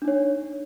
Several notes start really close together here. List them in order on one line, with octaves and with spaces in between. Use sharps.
D4 D#4 C#5